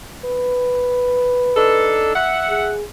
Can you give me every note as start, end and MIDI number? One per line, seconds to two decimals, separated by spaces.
0.25 2.02 71
1.55 2.10 62
1.55 2.10 63
1.55 2.10 69
2.15 2.71 76
2.15 2.71 78
2.49 2.85 68